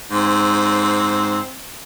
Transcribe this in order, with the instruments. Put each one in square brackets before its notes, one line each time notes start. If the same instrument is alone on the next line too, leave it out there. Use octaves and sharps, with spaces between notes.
[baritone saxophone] G#2 [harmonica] C4